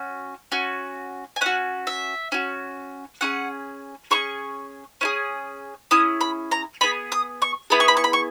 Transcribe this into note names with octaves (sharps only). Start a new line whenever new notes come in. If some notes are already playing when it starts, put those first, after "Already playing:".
Already playing: C#4 F#4
C#4 F#4
G#5
C#4 F#4 F#5
E5
C#4 F#4
C#4 E4 G#4 F#5
C#4 E4 G#4 C#6
C#4 E4 G#4
C#4 E4 G#4 D#6
B5
A#5
B3 E4 G#4 B5
D#6
C#6
B3 E4 G#4 B5
C#6
B5
C#6
B5
C#6